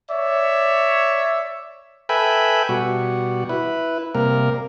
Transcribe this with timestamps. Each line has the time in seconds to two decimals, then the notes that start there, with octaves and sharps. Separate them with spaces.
0.10 C#5 D5 E5
2.09 A4 B4 E5 G5 G#5 B5
2.69 B2 G3 F#4
3.49 E4 B4
4.15 C3 G3 A#3 A#4